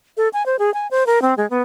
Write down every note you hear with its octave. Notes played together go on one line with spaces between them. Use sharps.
A4
G#5
C5
G#4
G#5
C5
A#4
C4
G#3
B3